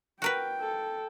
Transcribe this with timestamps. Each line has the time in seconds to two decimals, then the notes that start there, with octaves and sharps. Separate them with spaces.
0.22 F#4 A#4 B4 G5
0.61 A4